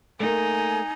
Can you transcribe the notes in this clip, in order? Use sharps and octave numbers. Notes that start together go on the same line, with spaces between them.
A3 A#3 D#4 G#5